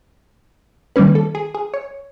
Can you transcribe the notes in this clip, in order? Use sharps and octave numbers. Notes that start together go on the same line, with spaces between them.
D#3 G3 A#3 C#4 B4
A4
G#4
G#4
C#5